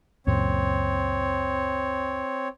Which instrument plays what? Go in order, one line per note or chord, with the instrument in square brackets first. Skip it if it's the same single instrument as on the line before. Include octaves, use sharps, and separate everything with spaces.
[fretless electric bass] C#2 F#2 A#2 [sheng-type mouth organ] C4 C#5